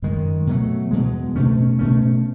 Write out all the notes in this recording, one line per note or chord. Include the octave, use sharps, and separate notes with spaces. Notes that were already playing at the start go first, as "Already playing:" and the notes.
F#2 D#3 G#3
B2 F#3 A3
E2 B2 G#3
B2 A3 C#4
B2 A3 C#4